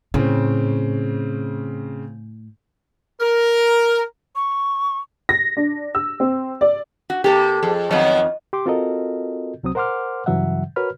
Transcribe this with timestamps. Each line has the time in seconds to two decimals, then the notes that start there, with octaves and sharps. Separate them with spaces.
0.14 A2 C#3 C4
3.21 A#4
4.36 C#6
5.29 A#6
5.57 D4
5.95 E6
6.20 C4
6.61 D5
7.10 F#4
7.24 C3 A#3 G4 A4
7.63 F2 G#4
7.91 F2 D#3 F3 F#3 B3 D#5
8.53 G4 C6 D6
8.66 C4 F4 F#4 A4 A#4 D#5
9.63 C2 F#3 C4 D#6
9.75 A#4 C5 F#5 C6 D6 F6
10.26 G2 C#3 E3 F#3 E5 F#5
10.76 F#4 A#4 B4 C#5 B5 F6